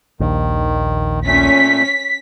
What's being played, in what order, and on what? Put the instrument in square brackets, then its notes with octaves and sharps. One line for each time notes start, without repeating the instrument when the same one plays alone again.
[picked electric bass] A#1 D#2 [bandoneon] D#3
[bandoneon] A#2 A3 [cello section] C#4 [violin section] B6